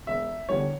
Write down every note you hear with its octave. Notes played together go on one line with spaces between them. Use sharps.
E1 E5
E2 D3 G3 C#5